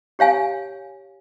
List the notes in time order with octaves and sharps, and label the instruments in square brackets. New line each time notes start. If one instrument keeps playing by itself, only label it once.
[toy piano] G4 C#5 F5 G#5